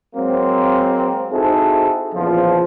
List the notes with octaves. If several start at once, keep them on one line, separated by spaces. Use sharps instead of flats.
F#3 G#3 A#3 C4
C4 D#4 E4 F#4 G#4 A4
E2 A#2 C#3 F3